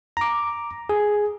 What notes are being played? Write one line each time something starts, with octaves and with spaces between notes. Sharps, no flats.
A#5 D6
G#4